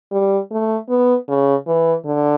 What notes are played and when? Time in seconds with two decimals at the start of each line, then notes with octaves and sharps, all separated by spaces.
0.11 G3
0.51 A3
0.89 B3
1.28 C#3
1.67 E3
2.05 D3